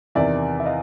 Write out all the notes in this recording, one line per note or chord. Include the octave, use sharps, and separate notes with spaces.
E2 C3 D#3 D5 E5
E5
D#5 F5